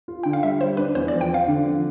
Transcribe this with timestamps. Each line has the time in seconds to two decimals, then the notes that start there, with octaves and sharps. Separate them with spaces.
0.08 F4
0.23 D3 G5
0.33 F5
0.43 G3 E5
0.61 G3 C5
0.77 D4 B4
0.95 E2 C5
1.08 F3 D5
1.21 G5
1.30 C4 F5
1.48 D3
1.65 F3